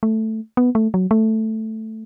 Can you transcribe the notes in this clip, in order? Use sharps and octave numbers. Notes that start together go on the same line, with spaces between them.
A3
B3
A3
F#3
A3